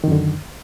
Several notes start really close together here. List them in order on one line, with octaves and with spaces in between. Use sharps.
D#3 F#2 D3